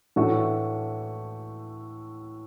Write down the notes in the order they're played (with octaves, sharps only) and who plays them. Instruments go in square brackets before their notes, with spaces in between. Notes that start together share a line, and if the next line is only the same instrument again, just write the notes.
[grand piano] A2 E3 A3 D4 F#4